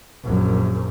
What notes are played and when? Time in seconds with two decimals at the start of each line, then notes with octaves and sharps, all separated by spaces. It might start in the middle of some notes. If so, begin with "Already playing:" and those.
0.24 A#1 F#2